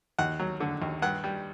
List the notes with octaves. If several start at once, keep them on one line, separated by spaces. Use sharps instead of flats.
D#2 F#5
F#3
D3
D#2
G2 F#5
G3